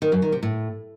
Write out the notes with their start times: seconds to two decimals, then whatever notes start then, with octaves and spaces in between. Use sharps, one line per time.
0.02 D#3
0.12 F#2
0.22 D#3
0.32 C3
0.43 A2